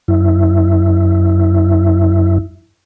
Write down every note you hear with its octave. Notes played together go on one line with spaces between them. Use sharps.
F#2 E4